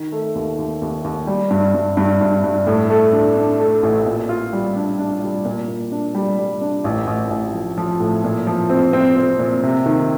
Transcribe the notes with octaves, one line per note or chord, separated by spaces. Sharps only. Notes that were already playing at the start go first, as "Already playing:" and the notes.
Already playing: D#3
A3
D#2
D#2
D#2
D#2
G3
G2
G2
G2
G2
G2
A2
A3
D4
D4
A3
A1
A#2
F4
G3
D4
D4
G3
A#2
A#2
D4
G3
G3
D4
A1
A1
A1
F3
F3
A2
A#2
F3
C4
C4
C4
A#2
C3
D#3